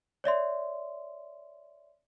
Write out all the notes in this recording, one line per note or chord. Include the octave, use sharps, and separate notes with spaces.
C#5 D5 E5 C6